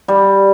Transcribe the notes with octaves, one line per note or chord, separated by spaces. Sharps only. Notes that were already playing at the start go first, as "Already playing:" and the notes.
G3